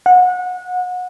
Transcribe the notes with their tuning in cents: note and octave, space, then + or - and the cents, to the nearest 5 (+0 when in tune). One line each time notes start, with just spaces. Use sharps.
F#5 -25